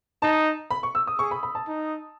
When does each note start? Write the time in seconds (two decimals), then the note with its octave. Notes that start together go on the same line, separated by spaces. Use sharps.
0.22 D#4 A5
0.71 B5
0.83 C#6
0.95 E6
1.07 D#6
1.19 G#4 C#6
1.31 B5
1.43 B5
1.55 A5
1.68 D#4